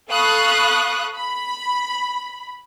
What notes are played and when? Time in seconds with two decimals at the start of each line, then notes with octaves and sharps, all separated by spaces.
0.11 A4 F5 B5 C#6 D#6 F#6
1.15 B5